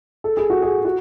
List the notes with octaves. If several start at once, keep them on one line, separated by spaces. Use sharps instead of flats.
A4
G#4
F#4
G#4
F#4